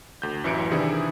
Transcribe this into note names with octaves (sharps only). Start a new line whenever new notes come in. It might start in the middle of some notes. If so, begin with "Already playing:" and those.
D2 G6
A1 F#2 E4 B4 C#7 D7
C3 D#3 E3 D4 E4 G#4